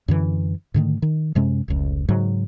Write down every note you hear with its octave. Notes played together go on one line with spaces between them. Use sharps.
F#2 D3 E3
G#2 D3 D#3 A3
D#3
F#2 C3 G#3 C#4
F1 C#2
G#2 C#3 F#3